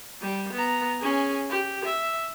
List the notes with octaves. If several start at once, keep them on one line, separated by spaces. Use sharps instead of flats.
G3
B3 A#5
C#4 G#4
G4
E5